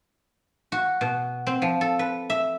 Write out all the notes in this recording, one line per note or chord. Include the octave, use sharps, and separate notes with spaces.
F#4
B2
C4
F3
A4
B4
E5